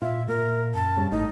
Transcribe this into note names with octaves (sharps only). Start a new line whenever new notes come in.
A#2 F4 E5
A#2 A#3 A#4
F#2 A5
G2 C#3
G#1 A2 D#4